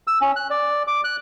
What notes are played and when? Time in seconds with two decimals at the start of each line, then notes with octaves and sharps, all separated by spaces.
0.07 E6
0.21 C#4
0.36 F#6
0.50 D5
0.87 D6
1.04 F#6